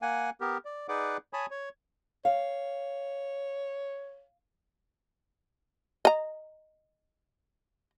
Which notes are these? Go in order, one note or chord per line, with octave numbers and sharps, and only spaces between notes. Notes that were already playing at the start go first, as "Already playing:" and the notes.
A#3 F#5 G#5
B3 G4 A#4
D5
D#4 G#4 B4 D5 F#5 D6
C#5 G#5 A5 B5 D#6
C#5
C#5 F5
D#5 A#5